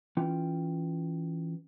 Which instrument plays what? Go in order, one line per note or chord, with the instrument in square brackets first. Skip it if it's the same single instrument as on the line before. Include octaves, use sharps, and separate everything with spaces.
[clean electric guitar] E3 C#4 F4 G5